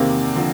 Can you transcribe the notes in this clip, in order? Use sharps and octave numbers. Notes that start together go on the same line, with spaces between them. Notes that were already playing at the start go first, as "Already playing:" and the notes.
Already playing: E2 C3 D#3 A#3 C4
D3 F3